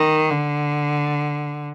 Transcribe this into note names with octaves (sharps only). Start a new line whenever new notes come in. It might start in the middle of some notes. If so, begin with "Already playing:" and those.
Already playing: D#3
D3